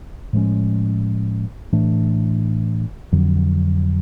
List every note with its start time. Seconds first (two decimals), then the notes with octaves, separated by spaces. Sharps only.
0.33 A2 F3 G#3 C#4
1.73 A2 E3 A3 D4
3.12 F2 D3 F#3